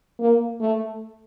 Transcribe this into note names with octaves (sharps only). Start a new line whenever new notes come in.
A#3
A3